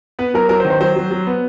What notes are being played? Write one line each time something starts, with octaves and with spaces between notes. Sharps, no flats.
B3 B4
F#3 A#4
F#3 A#4
C5
D#3
C5
F#3 C5
F#3
F#3
B3